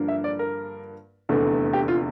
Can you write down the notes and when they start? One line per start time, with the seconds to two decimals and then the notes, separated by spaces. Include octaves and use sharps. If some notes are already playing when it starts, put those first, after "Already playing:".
Already playing: G2 D3 F3 A#3 D4
0.08 E5
0.24 D5
0.39 A#4
1.29 F1 E2 D3 A3
1.73 G4
1.88 F4